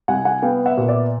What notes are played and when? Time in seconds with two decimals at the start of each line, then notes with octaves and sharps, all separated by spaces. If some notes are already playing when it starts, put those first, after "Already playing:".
0.08 C2 F#5 G#5
0.25 F#5 G#5
0.42 B3 F5 G5
0.66 E5 F#5
0.77 A#2
0.88 D5 E5